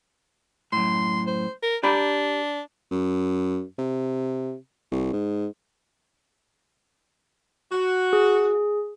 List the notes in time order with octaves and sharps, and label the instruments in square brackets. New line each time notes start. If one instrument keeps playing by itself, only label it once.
[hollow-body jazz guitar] F#2 A2 [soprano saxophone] C6
[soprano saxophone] C5
A#4
[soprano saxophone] D4 [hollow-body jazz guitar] G4 A#5 B5
[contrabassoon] F#2
C3
C2
G#2
[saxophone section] F#4
[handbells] G#4